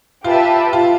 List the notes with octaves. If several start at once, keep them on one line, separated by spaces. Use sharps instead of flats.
F4 G4 B4 E5 A5
F4